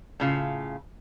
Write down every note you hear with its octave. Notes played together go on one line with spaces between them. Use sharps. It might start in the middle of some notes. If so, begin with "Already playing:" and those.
A2 C#3 F4